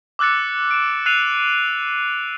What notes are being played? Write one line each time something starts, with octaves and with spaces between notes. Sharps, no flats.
D6 E6 F#6 A6 C#7
D7 E7
E6 F#6 A6 C7 D#7 F7